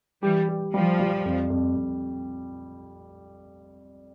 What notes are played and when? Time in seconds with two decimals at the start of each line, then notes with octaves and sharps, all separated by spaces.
0.23 E3 G3 G4
0.49 G4
0.74 F3 G3
1.00 G3
1.25 F2
1.50 F2
1.76 F2